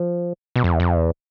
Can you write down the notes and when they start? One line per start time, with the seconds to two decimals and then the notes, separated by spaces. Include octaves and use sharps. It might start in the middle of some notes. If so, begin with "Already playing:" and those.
Already playing: F3
0.56 B2
0.64 F2
0.72 E2
0.80 F2
0.96 E2